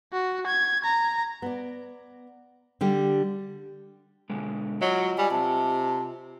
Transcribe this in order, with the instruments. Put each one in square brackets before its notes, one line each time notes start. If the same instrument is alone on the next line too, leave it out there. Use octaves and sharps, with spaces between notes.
[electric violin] F#4
G#6
A#5
[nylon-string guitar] B3 D5
D3 G3 G4
[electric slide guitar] B2 D3 G#3
[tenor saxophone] F#3 [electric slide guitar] F4 D#5
[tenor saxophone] G3 [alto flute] G#5
[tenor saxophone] C3 [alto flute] A5